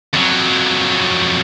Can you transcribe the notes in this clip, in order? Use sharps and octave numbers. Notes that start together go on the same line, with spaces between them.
F2 F#3